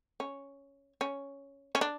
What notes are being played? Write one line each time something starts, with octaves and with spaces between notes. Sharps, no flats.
C#4
C#4
C#4
D4